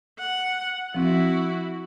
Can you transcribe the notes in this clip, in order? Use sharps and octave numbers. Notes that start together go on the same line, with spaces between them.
F#5
F3 C4 E4 F#4